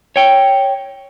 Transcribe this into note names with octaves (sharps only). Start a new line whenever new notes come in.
C#5 G5